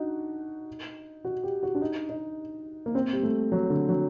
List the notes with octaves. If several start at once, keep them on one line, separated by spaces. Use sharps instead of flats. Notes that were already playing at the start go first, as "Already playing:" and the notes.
Already playing: D4 D#4 F#4
F#4
G4
F#4
D4
D#4
D#4
A#3
C4
G3
A3
F#3
D3
F#3